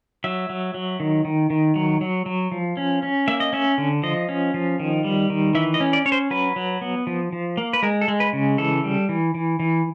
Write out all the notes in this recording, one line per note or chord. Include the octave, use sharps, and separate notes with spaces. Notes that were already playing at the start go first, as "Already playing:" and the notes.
F#3 E5
F#3
F#3
D#3
D#3
D#3
F#3
F#3
F#3
F3
C#4
C#4
A#3 E5
D#5
C#4 E5
D3
F3 D#5
C#4
F3
D#3
G3
D#3
E3 E5
D#5
C#4
D5
C#4 C#5
C5
F#3 B4
F#3
B3
F3
F3
A#3
B4
G#3 A#4
A4
G#3
B4
C#3
E3 A4
G3
E3
E3
E3